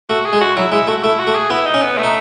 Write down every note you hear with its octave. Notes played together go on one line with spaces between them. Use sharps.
A3 F#4
G#4
G#3
F#4
F#3 E4
G#3 E4
A3 F#4
A3 E4
F#4
A3
G#4
B3 E4
D#4
C#4
B3
A3
D#4